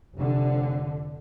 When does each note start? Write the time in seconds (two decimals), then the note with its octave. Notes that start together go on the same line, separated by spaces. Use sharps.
0.18 F1 D3